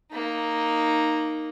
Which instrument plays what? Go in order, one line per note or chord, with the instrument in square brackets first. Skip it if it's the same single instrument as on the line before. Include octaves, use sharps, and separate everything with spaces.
[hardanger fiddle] A#3 D#4